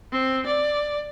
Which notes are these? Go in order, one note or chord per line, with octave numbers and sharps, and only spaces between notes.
C4
D5